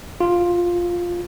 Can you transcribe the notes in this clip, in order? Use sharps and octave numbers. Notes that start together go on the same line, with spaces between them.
F4